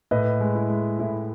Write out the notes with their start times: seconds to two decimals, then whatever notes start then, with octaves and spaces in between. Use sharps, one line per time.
0.11 A2 B4 D#5
0.41 G#3
0.55 E4
0.70 G#3
0.99 A2 E4